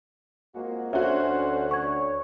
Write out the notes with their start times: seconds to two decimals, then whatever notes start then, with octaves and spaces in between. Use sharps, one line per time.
0.55 F2 G#3 A#3 F#4
0.93 D2 C#4 F#4 C5 E5
1.71 C#5 C#6 G#6